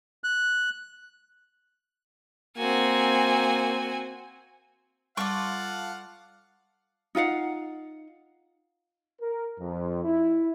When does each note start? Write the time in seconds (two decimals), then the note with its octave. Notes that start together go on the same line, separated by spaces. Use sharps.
0.24 F#6
2.58 A#3 C4 F#4 G#5
5.17 G3 F4 A4 D5 F5 F#5 C#6
7.15 D#4 F4 F5 F#5
9.20 A#4
9.59 F2
10.04 E4